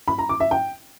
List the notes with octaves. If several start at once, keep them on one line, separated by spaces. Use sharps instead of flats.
B5
A#5
D6
E5
G5